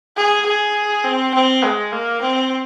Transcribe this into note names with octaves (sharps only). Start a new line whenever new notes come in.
G#4
G#4
C4
C4
G#3
A#3
C4